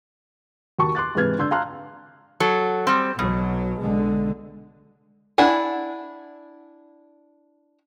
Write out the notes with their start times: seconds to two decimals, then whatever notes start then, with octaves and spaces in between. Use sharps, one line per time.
0.79 D#2 F#4 A5 C#6
0.95 C6 D6 F#6 A6
1.15 G#2 C3 E3 B4 F6 G#6
1.38 D3 D4 C6 E6 G6
1.51 F5 A5 A#5 C6 F6 F#6
2.40 F#3 A4
2.87 G3 C4
3.19 B1 B2 F#3
3.80 B1 D3 G#3
5.38 D4 E4 F#5 G#5